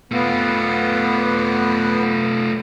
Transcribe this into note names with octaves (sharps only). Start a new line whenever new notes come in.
A3 B3 F4